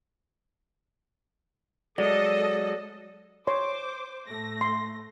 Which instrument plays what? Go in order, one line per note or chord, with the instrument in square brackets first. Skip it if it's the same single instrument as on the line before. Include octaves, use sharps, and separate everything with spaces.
[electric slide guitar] F#3 G#3 [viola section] A4 D#5 [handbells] D5
[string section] C5 D6 [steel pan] C#5 C6
[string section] A2 A3 A#6
[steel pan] C6